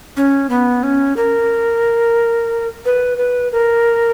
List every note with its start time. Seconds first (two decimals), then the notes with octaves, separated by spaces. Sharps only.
0.17 C#4
0.50 B3
0.83 C#4
1.17 A#4
2.85 B4
3.18 B4
3.52 A#4